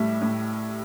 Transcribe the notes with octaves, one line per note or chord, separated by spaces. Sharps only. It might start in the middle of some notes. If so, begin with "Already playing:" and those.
Already playing: A2 G3 E5
A2